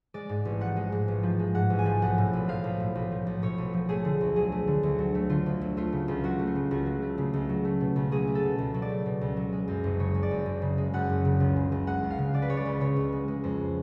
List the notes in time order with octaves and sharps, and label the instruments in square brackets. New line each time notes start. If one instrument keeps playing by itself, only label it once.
[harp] G#3 D5
G#2
A1
F3 F#5
G#3
G#2
A1
F3
G#3
G#2 F#5
A1
G#5
F3
B1 F#5
A2
B1
F3 F5
B1
A2
B1
F3
B1
A2 C#5
B1
F3
A3 G#4
D3
D2
F#3 G#4
A3
D3
D2
F#3
A3
D3 F4
D2
F#3
A3 F4
C#3
C#2
F#3 F#4
A3
F4
C#3
C#2 F#4
F#3
A3
C#3
C#2
F#3
A3
B2
C#2
F#3 G#4
A3
A4
B2
C#2
F#3
D5
A3
B2
C#2
F#3
G#3
F#2
F#1
C#3 C#5
G#3
D5
F#2
F#1
C#3
G#3
F#2 F#5
F#1
C#3
C#2
C#3
C#2
G#3 F#5
C#2
F5
C#3
C#2 D5
B4
G#3 C#5
D5
C#2
C#3 C#5
C#2
G#3
G#3
F2